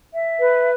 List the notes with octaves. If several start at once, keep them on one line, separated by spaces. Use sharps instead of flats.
E5
B4